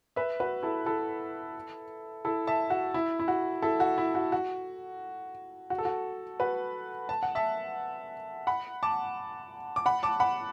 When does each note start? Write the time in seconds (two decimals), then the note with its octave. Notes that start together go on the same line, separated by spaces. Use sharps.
0.16 B4 E5
0.40 F#4 B4
0.63 E4 A4
0.86 E4 A4
2.25 E4 A4
2.47 E5 A5
2.70 F#4
2.94 E4
3.19 E4
3.28 F#4
3.62 E4 A4
3.80 F#4
3.98 E4
4.15 F#4
4.32 F#4
5.70 F#4
5.78 A4
5.85 F#4
6.40 F#4 B4
7.09 A5
7.23 F#5
7.35 E5 A5
8.47 F#5 B5
8.83 A5 D6
9.76 D6
9.86 F#5 B5
10.03 A5 D6
10.20 F#5 B5